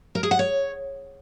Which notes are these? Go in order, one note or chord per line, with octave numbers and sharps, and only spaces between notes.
A#4
G#4
F#5
C#5